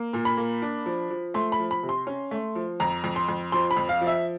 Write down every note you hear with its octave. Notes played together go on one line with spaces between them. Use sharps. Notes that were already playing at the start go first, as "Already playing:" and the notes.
Already playing: A#3
A#2
B5
A#3
D4
F3
F3
A3 C6
B5
F3
B5
C3
C6
C#4
A3
F3
F2 A#5
F2
C6
F2
F3 C6
B5
F2
F5
F3
E5